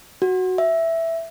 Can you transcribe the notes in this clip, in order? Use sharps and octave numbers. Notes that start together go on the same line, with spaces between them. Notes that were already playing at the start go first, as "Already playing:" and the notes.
F#4
E5